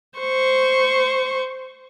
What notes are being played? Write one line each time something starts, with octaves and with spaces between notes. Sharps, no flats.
C5 C#6